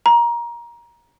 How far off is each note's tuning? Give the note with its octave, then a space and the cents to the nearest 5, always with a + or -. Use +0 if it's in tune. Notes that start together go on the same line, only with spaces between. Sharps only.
A#5 +20